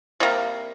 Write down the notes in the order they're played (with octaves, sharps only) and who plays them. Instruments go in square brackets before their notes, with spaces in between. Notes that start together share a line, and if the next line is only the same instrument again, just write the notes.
[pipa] C3 G3 A#3